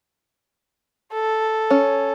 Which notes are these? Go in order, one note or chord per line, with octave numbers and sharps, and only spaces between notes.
A4
C#4